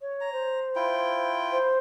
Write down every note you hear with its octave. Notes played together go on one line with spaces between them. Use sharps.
C#5
A#5
C5
E4 F4 G5
C5